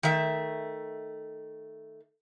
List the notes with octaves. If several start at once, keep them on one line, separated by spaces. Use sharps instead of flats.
D#3 A3 E5